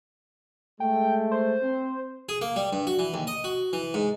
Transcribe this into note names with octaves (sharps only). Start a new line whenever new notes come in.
G#3 A3 G5
C5
C4
G#4
A#3
G3
G2
F#4
E3
D#2
D#5
F#4
E3
G#2